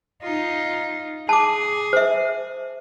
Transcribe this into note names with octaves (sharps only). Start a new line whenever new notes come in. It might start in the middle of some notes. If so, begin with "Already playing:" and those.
D#4 F4
G#4 A5 D6
C5 E5